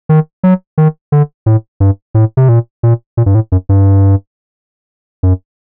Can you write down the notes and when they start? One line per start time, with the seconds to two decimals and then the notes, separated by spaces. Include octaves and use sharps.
0.09 D#3
0.43 F#3
0.78 D#3
1.12 D3
1.46 A2
1.80 G2
2.15 A2
2.37 C3
2.49 A#2
2.83 A#2
3.17 A#2
3.26 G2
3.35 A2
3.52 F#2
3.69 G2
5.23 F#2